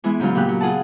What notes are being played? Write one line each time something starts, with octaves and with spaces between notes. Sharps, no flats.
E3 G#3 B3 E4
G#2 C#3 F#3 F4
A#2 C#3 G4 F#6
F#3
F4 G#4 F#5 A5